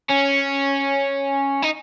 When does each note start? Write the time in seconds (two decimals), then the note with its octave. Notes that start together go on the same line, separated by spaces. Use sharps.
0.09 C#4
1.62 D#4